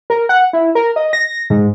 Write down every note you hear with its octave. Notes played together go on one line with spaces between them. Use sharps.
A#4
F#5
E4
A#4
D#5
A#6
G#2